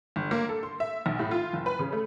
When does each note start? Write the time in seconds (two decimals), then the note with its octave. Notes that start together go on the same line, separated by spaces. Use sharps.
0.16 G1
0.31 A#3
0.49 A4
0.63 C6
0.80 E5
1.06 B1
1.19 A2
1.31 F4
1.53 F#1
1.66 B4
1.79 C#3
1.93 A3